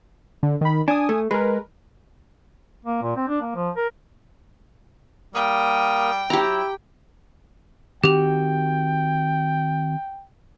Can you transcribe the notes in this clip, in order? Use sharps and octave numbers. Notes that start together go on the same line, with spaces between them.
D3
D#3 B5
D4 G#5 D#6
A3
G#3 A#4 B4
A#3
A#2
C4
D4
A#3
F3
A#4
G3 A#3 A#4 G5 D#6
F#3 E4 G4 A#5
D#3 C4 F#4 G4 G5 F7